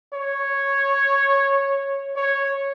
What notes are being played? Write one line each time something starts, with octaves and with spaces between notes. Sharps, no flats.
C#5
C#5